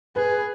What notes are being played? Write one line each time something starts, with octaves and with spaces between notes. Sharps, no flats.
G#4 B4